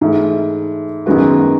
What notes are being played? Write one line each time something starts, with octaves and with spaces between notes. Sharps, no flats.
G#2 E3 A3
F#2 D#3 G#3 B3 F#4